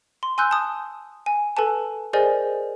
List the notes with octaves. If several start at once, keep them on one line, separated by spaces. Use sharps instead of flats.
C6
G#5 C6 E6 F#6 G6
A5 D#6
G#5
A4 B4 G#5 A5
G#4 A#4 C5 D5 D#5 G#5